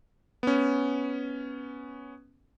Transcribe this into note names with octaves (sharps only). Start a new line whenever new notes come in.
B3 C#4